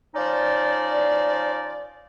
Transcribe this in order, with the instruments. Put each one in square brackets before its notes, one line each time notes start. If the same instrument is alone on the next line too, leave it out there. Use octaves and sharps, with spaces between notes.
[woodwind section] F3 C#4 D#4 C5 D5